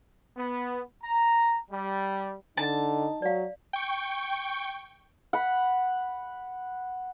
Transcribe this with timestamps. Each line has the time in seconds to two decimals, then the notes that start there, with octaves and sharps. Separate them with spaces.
0.37 B3
1.04 A#5
1.71 G3
2.57 D3 D#4 A5
3.22 F#3 D5 F5
3.73 G5 C#6
5.33 F#5 B5